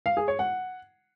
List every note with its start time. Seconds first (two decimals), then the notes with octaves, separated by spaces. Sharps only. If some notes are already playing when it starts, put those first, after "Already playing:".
0.06 F5
0.17 G#4
0.28 C#5
0.39 F#5